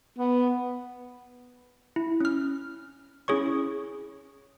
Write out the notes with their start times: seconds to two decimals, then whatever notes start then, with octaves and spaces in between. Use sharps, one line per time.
0.18 B3
1.96 E4
2.20 C#4 F6
3.28 C#4 E4 G#4 C#5 C#6